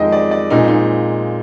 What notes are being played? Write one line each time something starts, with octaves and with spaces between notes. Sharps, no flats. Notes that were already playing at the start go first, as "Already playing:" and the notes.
Already playing: F2 D#3 G#3 D#5 G5
D5
D5
A#1 A#2 G#3 C4 D#4
D#4